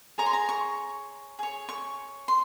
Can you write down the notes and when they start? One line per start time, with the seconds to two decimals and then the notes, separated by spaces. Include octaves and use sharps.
0.18 G#4 C#5 A#5
0.26 C6
0.33 A#5
0.49 C#6
1.39 G#4 C#5
1.69 C#6
2.28 C6